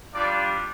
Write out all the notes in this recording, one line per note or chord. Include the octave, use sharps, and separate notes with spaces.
G3 D4 F4 D5